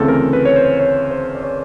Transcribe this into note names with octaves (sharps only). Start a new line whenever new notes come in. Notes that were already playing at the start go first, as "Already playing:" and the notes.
Already playing: D2 C#3 E3 A3 C4 A4
A#4
B4
C#5
C5
C#5
C5
D5
C#5